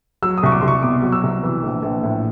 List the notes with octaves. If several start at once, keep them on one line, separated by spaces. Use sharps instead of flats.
F#3 E6
D#6
C2 C#6
D6
C2 C6
C#6
B2 D6
F#3
E6
C2
E3
A#1
A#1
A2